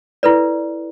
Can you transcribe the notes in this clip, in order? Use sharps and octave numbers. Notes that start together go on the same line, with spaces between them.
E4 A4 B4 D5